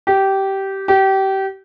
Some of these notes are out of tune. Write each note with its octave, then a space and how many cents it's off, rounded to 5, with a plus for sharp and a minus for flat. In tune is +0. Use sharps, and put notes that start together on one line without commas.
G4 -15
G4 -25